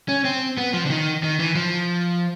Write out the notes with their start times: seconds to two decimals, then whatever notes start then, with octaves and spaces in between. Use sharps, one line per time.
0.09 C#4
0.25 C4
0.58 B3
0.73 F3
0.86 D3
0.90 D#3
1.23 D#3
1.39 E3
1.55 F3